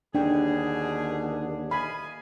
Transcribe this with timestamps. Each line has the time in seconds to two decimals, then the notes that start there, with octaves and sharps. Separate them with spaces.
0.15 D#2 B2 D3 D4 G#4 G5
1.71 D#5 F5 G#5 B5